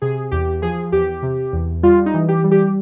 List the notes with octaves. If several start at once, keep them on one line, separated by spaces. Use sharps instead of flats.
C3 G#4
E2 G4
F3 G#4
E2 G4
C3
E2
G3 F4
D#4
E3
G4
G3
G4